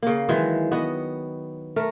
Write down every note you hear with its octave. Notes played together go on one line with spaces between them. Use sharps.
C#3 A#3
D#3 E3 F#3 G#3
B3 F#4 D#5
A3 A#4